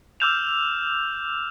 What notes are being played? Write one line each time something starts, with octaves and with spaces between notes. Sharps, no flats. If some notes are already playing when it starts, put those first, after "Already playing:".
D6 E6 F6 G6 E7 F7